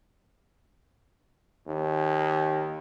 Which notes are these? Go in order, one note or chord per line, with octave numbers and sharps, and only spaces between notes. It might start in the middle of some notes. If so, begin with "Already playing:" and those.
D#2